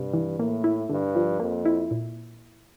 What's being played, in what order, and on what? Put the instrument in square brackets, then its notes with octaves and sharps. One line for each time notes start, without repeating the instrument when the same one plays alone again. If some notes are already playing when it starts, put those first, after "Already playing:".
Already playing: [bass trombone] G2 [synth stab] C3
[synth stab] E3
[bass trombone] A2 [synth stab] A#3
[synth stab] E4
[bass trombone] G2 [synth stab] D3
[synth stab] F3
[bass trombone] F2 [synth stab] A#3
[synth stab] E4
A#2